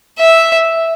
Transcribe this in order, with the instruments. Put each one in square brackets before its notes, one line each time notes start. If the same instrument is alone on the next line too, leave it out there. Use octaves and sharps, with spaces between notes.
[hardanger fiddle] E5